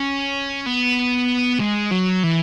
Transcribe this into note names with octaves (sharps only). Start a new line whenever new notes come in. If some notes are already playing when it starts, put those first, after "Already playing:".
Already playing: C#4
B3
G#3
F#3
E3